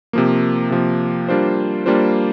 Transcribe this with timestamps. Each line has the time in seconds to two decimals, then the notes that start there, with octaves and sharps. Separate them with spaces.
0.13 C3 F3 A#3
0.71 C3 F3 A#3
1.28 G3 A#3 D4 F4 C5
1.86 G3 A#3 D4 F4 C5